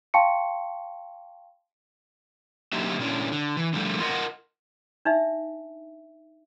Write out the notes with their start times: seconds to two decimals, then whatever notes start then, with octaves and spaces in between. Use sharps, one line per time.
0.14 F5 G5 A5 C6 C#6 C#7
2.73 D3 F#3 A#3 D#4 G4 E5
2.99 A#2 C#4 D4 E4
3.32 D3
3.57 E3
3.73 D3 F3 G3 A3
4.00 F4 A#4 D#5 E5 F#5
5.05 D4 D#4 E5